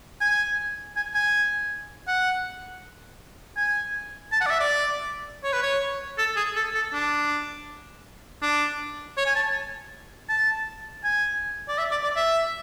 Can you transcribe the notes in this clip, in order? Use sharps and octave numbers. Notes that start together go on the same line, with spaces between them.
G#5
G#5
G#5
F#5
G#5
A5
F#5
D5
E5
D5
C#5
B4
C#5
A4
G#4
A4
A4
D4
D4
C#5
G#5
A5
A5
G#5
D5
E5
D5
D5
E5